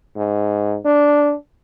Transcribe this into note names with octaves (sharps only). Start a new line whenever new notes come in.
G#2
D4